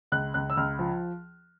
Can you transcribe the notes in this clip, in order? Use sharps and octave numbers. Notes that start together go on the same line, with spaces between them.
C#2 F#6
C#2 F#6
E6
C#2 F6
F3